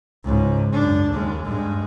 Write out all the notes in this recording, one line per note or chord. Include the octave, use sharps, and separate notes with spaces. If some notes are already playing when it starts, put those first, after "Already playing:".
C#2 G#2
F#2 D4
D#2 G#3
G2 G#3